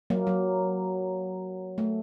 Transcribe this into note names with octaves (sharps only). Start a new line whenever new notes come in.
F#3 A#3
F#3
A3